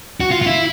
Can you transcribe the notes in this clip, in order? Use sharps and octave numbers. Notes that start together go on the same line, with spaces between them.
F#4
F4
F4
E4